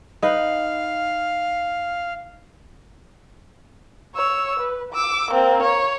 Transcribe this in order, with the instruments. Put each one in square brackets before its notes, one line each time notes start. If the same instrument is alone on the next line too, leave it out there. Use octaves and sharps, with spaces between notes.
[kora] D#4 B4 [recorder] F5
[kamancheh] C#5 E6
B4
D6 E6
A#3 C4
C#5